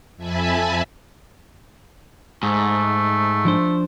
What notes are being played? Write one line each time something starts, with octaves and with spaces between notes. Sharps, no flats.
F2 E5 G#5 A5 B5
G#2 A3
F3 D4 C5